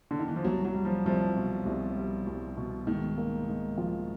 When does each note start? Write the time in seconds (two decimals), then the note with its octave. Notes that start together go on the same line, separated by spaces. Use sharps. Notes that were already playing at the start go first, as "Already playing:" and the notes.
0.11 D3
0.19 D#3
0.28 E3
0.36 F3
0.44 C2 F#3
0.65 F#3
0.75 G3
0.85 F3
1.06 C2 F3
1.36 B2
1.66 C2
1.96 G3
2.27 C2
2.57 B2
2.87 G#2 D#3
3.18 A#3
3.48 G#2
3.78 F3